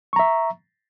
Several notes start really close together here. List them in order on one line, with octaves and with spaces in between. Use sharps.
C#6 A#5 E5